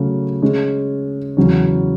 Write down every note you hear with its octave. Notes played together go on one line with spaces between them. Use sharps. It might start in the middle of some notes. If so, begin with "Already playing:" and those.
Already playing: C#3 F#3 A3 C#4
C#3 G#3 C#4
E2 C#3 F#3 C#4